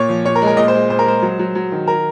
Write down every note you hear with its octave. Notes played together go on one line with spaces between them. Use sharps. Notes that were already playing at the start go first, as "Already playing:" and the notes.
Already playing: A#2 C#5
F3
A#2 C#5
A#4
G#3
A#4
A#2 D#5
C5
G#3
A#2 C5
A#4
G#3 C5
F#3
F#3
F#3
D#3
A#4